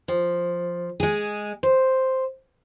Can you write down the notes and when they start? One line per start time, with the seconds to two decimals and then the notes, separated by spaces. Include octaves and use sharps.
0.08 F3
1.00 G#3 G#4
1.63 C5